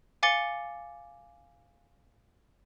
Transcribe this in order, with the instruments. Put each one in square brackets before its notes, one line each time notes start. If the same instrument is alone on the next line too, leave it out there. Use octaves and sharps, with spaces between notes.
[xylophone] F5 G#5 D6 A6 C#7 G7